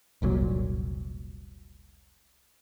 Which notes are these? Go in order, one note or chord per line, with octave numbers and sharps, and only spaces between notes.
F1 C2 A#2 F#3